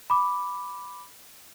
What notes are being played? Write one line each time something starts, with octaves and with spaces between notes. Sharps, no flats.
B5 D6